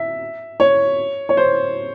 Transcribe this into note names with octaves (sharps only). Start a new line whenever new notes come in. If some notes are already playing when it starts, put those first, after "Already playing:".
Already playing: E5
C#5
C#5
C5